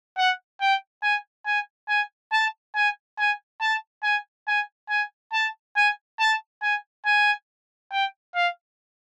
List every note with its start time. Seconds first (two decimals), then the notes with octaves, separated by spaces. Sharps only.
0.17 F#5
0.61 G5
1.03 G#5
1.47 G#5
1.89 G#5
2.33 A5
2.76 G#5
3.19 G#5
3.61 A5
4.04 G#5
4.48 G#5
4.90 G#5
5.33 A5
5.77 G#5
6.20 A5
6.63 G#5
7.06 G#5
7.92 G5
8.35 F5